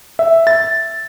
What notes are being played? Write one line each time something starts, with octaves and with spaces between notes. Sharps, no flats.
E5
A6